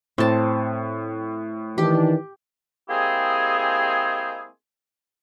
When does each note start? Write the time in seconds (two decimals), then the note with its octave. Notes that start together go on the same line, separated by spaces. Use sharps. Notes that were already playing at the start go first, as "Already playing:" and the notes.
0.18 A2 C4 A5
1.78 D#3 E3 D4 G4
2.89 G#3 A#3 C4 E4 G4 G#4